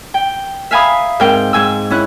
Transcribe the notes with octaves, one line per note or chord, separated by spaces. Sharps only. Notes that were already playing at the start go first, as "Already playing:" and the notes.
G5
E5 F5 G#5 A#5 B5 D#6
G#2 C4 A#4 G5
G#2 G#5 E6
C#4 E4 F#6